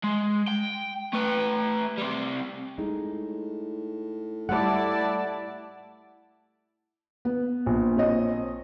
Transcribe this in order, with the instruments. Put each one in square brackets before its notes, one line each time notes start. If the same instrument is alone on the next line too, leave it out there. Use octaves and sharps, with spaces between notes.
[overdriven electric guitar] G#3
G5
A3 B4
G3 C4
[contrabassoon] A2 [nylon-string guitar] G#3 D#4
[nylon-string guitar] G3 A3 [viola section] E4 D5 A5 [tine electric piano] F#5
[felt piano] B3
[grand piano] A#1
[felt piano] C4 C#5 D#5